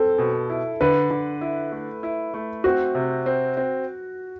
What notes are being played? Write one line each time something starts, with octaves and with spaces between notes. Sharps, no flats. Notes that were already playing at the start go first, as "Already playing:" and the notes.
Already playing: C4 A4
B2
E4
D3 B4
D3
E4
A3
E4
A3
C4 F#4
C3
C4
C4